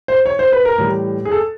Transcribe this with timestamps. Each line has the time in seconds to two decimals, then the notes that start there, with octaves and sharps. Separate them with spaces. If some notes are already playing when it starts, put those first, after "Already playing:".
0.08 C5
0.26 C#5
0.39 C5
0.52 B4
0.65 A#4
0.78 A2 E3 G3
1.25 G#4
1.32 A4